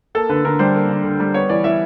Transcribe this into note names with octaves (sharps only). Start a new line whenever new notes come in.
A#3 A4
D3 B4
D3 A#4
G3 C5
A#3
D3
D3
G3
B3 C#5
E3 D5
E3 E5